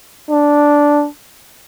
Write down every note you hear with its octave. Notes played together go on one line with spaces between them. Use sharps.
D4